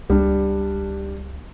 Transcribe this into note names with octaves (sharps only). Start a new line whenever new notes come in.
C#2 G3 D4